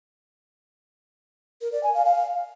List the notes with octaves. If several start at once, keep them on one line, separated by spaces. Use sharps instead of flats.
A#4
D5
G#5
F5
F5